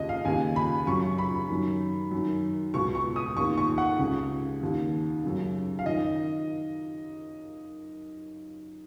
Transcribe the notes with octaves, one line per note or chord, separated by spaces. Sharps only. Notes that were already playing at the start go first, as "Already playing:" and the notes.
Already playing: D#2 C#3 D#5
F5
D#2 C#3 G#5
B5
F#2 C#3 C#6
B5
F#2 D#3
F#2 D#3
C#2 B2 C#6
C#6
D#6
D#2 D#3 C#6
C#6
F#5
C#2 C#3
D#2 D#3
F#2 C#3
F5
D#3 D#5